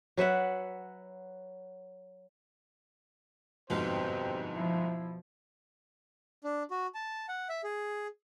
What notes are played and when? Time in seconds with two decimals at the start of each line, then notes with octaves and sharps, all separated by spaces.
0.17 F#3 B4 E5 F#5
3.70 G1 F2 G#2 B2 C4 G4 C5 F5
4.55 F3 E4
6.44 D4
6.71 F#4
6.94 A5
7.29 F#5
7.49 E5
7.64 G#4